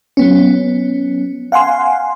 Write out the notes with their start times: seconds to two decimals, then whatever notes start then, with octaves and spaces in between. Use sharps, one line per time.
0.17 F#3 B3 C#4
1.52 F5 F#5 G#5 C6